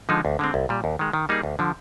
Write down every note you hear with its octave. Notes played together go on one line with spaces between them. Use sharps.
D3 F3 G#3 D#4
D2
D3 G#3 C4
C2
A#2 G3
D#2
D#3 G#3
D#3
G3 A#3 D#4 G#4
D2
D3 F3